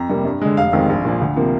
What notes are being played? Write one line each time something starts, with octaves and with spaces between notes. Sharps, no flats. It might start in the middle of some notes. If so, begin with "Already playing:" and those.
Already playing: F2 A#5
C3 G3 A#3
G2
D3 G#3
F1 F5
F2 D#3 G#3 C4
A#1
A#2 F3
D2
C3 F3 A#3